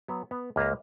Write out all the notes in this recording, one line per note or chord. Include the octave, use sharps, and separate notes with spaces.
F#3 B3
B3
C#2 A#3 B4 E5 A#5